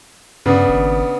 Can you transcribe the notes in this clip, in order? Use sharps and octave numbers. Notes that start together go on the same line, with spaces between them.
G2 C#3 B3 D4
G#1